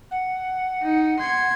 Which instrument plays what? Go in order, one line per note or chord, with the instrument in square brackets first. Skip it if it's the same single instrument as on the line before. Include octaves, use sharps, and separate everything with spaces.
[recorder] F#5
[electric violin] D#4
C6 G#6